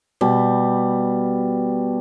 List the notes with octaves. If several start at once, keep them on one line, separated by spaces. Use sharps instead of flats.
B2 G3